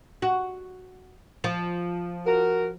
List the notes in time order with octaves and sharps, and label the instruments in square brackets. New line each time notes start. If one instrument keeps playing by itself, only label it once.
[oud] F#4
F3
[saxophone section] F#4 A#4